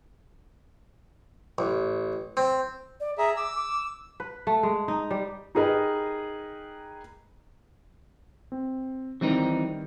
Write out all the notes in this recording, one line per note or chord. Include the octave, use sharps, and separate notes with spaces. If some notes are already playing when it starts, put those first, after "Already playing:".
A1
C4
D5
G#4 E5 A#5
D6 E6
D6
B4
A3
G#3
D#4
G3
D#4 G4 G#4 A#4 B4 D#5
C4
D#3 E3 G3 C4 D#4